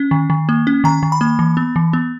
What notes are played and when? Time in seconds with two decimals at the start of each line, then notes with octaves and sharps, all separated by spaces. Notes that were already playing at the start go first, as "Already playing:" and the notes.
Already playing: C#4
0.11 D#3
0.30 D#3
0.49 A#3
0.67 C#4
0.84 D#3 A#5
1.03 D#3
1.12 B5
1.21 A#3
1.39 E3
1.57 B3
1.76 E3
1.93 B3